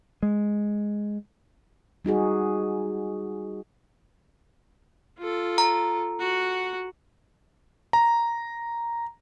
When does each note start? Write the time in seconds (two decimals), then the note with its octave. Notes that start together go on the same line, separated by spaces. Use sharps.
0.23 G#3
2.05 G3 D#4 F#4 G#4
5.18 F4 A4
5.58 A#5
6.20 F#4 F#5
7.93 A#5